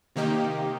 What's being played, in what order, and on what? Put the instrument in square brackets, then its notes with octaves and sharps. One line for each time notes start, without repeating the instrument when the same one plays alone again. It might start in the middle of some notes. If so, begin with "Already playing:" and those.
[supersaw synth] C3 D#3 A#3 D#4 G4